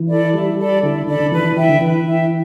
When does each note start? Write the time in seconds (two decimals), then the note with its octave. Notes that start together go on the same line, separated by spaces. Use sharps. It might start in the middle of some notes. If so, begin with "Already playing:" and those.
Already playing: E3
0.09 A4 D5 B5
0.34 G3 E4
0.58 A4 D5 B5
0.82 D3 E4
1.07 D3 A4 D5 B5
1.20 D3
1.32 E3 B4
1.44 E3
1.57 E3 E5 G5
1.69 D3
1.81 E3 B4
2.06 E5 G5